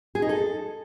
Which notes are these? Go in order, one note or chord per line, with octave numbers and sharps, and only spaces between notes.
G#4
D#4
A4